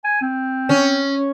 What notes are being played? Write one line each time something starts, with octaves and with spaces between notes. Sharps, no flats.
G#5
C4
C#4